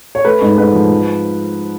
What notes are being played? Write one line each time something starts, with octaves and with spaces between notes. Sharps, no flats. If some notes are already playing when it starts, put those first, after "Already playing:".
C#5
A3 B4
G#2
G#2 B4
F3
F3